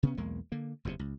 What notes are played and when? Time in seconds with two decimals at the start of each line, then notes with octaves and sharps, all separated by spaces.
0.03 C3 B3 C#4
0.17 B1 E2 G#3 A#3
0.52 D3 A#3
0.85 F#1 E2 A2 C3
0.99 C#2